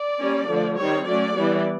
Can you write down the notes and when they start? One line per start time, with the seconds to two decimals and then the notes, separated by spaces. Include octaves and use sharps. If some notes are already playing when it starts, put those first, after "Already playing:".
Already playing: D5
0.20 G3 A#3 C#4
0.48 D3 F3 A3
0.77 D#3 G3 C4 C#5
1.06 F#3 A3 C#4 D5
1.36 E3 G3 B3